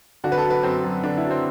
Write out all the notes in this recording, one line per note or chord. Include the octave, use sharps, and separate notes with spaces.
D3 F#4
B4
A4
F#3
B4
F#2 C4
F#2
D3 D4
E4
F#3
C4